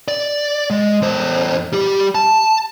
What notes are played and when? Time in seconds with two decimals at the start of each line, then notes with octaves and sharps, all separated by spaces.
0.08 D5
0.70 G#3
1.02 E2 C5
1.73 G3 G4
2.15 A5